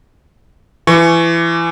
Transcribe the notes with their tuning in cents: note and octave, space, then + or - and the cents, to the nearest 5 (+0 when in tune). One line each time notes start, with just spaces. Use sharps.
E3 +25 C#6 +0